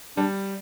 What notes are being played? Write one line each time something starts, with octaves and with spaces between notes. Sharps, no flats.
G3 D4